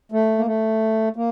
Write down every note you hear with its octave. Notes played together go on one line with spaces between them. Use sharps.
A3
A#3
A3
A#3